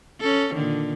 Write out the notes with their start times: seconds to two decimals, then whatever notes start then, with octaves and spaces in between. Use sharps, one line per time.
0.21 C#4 A4
0.54 A#2 D3 D#3